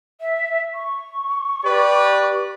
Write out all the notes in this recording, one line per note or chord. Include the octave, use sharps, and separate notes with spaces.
E5
C#6
G4 B4 D5